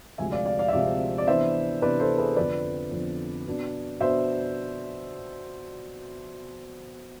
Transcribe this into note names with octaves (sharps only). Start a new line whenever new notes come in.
D2 C3 F3 G#3 E5 G#5
D5 F5
D5 F5
D5 F5
E5
D2 C3 F3 G#3 D5 F5
D5
C3 E3 B3 D4 C5 E5
C3 E3 B3 D4 B4 D5
A4 C5
G#4 B4
F2 D3 F3 B3 B4 D5
F2 D3 F3 B3
B2 B3 D4
B2 B3 D4 C5 E5